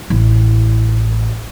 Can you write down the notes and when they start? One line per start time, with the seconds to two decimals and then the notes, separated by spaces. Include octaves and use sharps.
0.10 A1 E4